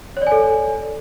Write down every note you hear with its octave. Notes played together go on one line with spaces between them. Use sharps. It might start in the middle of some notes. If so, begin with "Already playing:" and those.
A4 C#5 D5 G#5